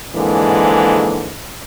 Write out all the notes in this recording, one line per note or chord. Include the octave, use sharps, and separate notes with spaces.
F2 G#2 D3 E3 G#3 A#3